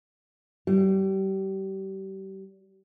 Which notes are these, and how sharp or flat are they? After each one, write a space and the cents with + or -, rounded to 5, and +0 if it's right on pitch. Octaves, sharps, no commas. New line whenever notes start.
G3 -30